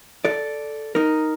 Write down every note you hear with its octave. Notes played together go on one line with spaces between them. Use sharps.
A4 D5
D#4 A#4